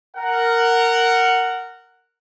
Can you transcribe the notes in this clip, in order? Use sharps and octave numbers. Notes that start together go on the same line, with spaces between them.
A#4 F#5